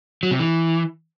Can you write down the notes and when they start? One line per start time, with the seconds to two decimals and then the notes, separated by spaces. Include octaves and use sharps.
0.23 F#3
0.31 C3
0.39 E3